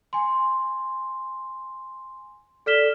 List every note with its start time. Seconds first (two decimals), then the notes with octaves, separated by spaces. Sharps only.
0.13 G#5 C6
2.66 A4 D5 F6 B6 E7 G7